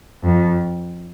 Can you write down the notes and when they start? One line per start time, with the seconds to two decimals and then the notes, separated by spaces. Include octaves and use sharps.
0.23 F2